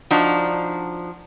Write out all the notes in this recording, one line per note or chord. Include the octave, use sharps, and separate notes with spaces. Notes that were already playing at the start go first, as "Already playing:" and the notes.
F3 D4 D#4 F#4